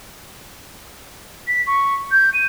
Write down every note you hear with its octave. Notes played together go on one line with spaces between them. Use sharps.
B6
C#6
G6
D#7